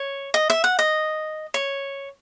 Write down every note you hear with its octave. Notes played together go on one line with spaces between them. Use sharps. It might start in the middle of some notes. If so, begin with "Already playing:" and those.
Already playing: C#5
D#5
E5
F#5
D#5
C#5